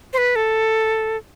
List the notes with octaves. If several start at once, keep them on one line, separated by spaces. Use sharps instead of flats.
C5
B4
A4